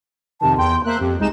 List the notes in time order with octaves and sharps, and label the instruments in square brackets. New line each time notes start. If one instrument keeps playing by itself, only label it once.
[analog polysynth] F2 C3 D#3 [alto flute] A5
[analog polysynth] E2 G5 [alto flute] C6
[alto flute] A#3 [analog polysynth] C5 E5 F#6
[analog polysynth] F2 [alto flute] G4
[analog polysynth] C2 D#4 E7 [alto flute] G#3